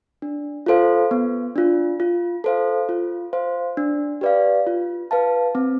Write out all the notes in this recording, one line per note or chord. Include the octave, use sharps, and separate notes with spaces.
D4
F4 A4 C5 F5
B3
D4 F4
F4
A4 C5 F5
F4
C5 F5
D4
G4 B4 D5 F5
F4
B4 F5 A5
C4